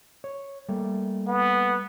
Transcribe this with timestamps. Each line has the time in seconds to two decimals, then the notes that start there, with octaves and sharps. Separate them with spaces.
0.24 C#5
0.69 G3 A3 A#3
1.27 B3